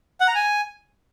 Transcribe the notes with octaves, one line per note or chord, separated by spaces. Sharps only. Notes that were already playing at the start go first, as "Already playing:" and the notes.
F#5
A#5
G#5